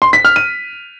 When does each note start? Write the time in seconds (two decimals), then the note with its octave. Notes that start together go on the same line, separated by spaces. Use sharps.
0.02 C6
0.13 B6
0.25 F6
0.36 D#7